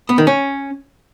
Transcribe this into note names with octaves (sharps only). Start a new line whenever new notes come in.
B3
D#3
C#4